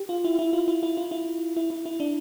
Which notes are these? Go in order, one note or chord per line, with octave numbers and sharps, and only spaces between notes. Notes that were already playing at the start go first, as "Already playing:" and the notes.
Already playing: G4
F4
E4
E4
F4
E4
E4
F4
E4
E4
E4
E4
D4